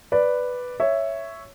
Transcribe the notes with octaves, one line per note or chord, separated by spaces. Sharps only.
B4 D5
C#5 E5